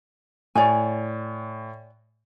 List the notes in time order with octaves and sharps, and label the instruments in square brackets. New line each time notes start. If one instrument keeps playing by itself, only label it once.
[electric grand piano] A2 [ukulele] C#5 D5 G#5